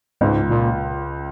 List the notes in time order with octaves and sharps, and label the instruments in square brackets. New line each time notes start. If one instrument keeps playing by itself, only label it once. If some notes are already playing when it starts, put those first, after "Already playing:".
[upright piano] C#2 [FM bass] G#2
[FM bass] A#2